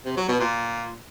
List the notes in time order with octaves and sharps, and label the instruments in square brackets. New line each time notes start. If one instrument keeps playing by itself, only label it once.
[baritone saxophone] C3
F#3
B2
A#2